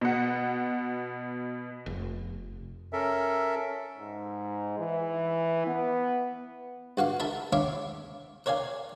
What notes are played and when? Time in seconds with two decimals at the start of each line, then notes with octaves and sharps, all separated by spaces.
0.01 B2 F#5
1.86 F1
2.93 C#4 A4 A#4 E5
3.98 G#2
4.79 E3
5.67 B3
6.97 G2 F#4 F5 C#6
7.20 A#4 E5 A5 B5
7.53 C#5 E5 F5 B5 C#6 D6
8.46 A#4 C#5 D5 F5 G#5